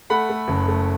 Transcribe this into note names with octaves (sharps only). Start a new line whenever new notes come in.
A3 F#5 B5
A3
F#1
A3